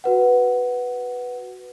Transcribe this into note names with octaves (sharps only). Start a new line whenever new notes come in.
F#4 B4 F#5